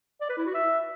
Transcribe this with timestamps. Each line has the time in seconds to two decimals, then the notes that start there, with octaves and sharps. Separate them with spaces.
0.21 D5
0.29 B4
0.38 E4
0.46 F#4
0.54 E5